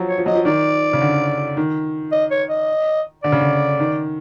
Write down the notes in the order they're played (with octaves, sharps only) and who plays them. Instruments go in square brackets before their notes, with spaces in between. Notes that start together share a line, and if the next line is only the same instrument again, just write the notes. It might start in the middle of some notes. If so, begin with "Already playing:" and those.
Already playing: [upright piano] F3 F#3
[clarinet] C#5
[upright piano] F3
[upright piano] F#3 [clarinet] D#5
[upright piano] F3
[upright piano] D#3 [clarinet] D5
[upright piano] C#3
D3
D#3
[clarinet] D#5
C#5
D#5
[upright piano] D3 [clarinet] D5
[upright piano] C#3
D3
D#3